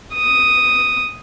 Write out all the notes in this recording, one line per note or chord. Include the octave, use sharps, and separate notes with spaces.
D#6